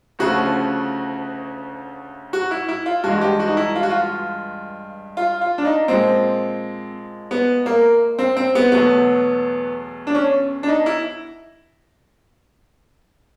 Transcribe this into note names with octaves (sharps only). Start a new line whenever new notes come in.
D2 C#3 F3 A3 F#4
F#4
E4
E4
F4
G2 E3 G#3 F#4
G4
F#4
D#4
E4
F4
F#4
F4
F4
F4
D4
D#4
A#2 F3 G#3 C4
B3
A#3
C4
C4
B3
E2 B2 F#3 A3 B3
D4
C#4
D4
D#4
E4